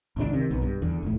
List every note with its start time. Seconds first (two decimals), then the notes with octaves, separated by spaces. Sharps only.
0.16 G#1 C#2 B2 D4
0.33 C3 D#3
0.50 B1 B3
0.62 G2
0.82 E2 D3
1.03 F1 A2